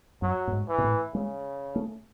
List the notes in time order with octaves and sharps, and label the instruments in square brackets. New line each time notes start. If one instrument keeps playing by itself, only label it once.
[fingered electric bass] F#2 [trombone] F#3
[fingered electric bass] A2
G#2
[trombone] E3
[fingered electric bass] B2
A2
[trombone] C#3 [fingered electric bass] G#3
[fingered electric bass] A3